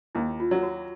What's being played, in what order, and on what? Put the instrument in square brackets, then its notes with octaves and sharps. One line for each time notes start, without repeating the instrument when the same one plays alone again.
[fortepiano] D#2 [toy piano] E4
[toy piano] F4
[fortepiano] F#3
[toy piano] F#4